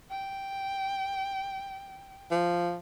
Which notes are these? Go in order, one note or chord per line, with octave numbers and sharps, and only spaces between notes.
G5
F3